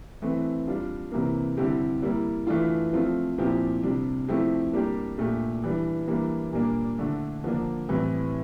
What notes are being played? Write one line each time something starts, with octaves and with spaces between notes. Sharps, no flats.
E3 A3 C4
G3 D4 F4
C3 E3 A#3
D3 G3 C4 E4 G4
G3 A#3 E4
E3 A3 D4 F4
F3 A3 C4 F4
A#2 F3 C4 E4 G4
C3 G3 D4
F3 A3 C4 E4 G4
G3 A#3 D4 G4
A#2 A3 D4 G4
E3 G3 D4
E3 G3 A#3 D4
A#2 G3 A#3 D4
D3 A3 D4
D3 F3 A#3 D4
A2 E3 G3 C4 E4